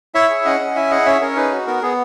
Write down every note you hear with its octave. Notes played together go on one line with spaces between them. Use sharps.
E4 C#5 E5
G#4
C#4 D#5 F#5
C#4
E4 E5 G#5
G#4 D#5 F#5
C#4 C#5 E5
C#4 A#4 C#5
D#4 G#4 B4
F#4
B3 A#4
B3 G#4